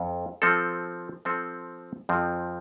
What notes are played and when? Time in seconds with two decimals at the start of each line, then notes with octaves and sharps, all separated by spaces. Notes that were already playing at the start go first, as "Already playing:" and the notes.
Already playing: F2
0.42 F3 C4 A4
1.25 F3 C4 A4
2.09 F2 F3 C4